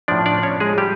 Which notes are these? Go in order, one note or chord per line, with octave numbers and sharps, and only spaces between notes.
A2 F3 D4 D5
D4 D5
C#4 C#5
G#3 G#4
G3 G4